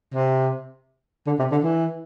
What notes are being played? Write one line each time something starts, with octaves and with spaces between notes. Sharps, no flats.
C3
D3
C3
D3
E3